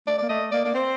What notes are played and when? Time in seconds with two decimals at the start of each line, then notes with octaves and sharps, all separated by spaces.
0.07 A3 D5
0.18 A#3 D5
0.29 A3 D#5
0.51 A#3 D5
0.65 A#3 D5
0.74 C4 C5